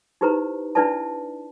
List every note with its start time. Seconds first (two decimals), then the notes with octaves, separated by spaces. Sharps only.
0.21 D#4 E4 G4 B4 C5 A#5
0.75 D4 E4 B4 D5 E5 A5